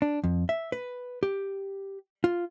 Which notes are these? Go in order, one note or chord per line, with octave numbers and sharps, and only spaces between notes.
D4
F2
E5
B4
G4
F4